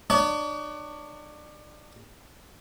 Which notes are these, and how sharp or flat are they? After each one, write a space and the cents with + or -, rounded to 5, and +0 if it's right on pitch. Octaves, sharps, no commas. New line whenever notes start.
D4 +35 C#5 +45